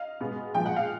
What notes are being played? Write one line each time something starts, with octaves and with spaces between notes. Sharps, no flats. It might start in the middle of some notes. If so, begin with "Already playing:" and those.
Already playing: D#5 F5
B2 G#3 B3
A#2 F3 G#3 G5
F#5
F5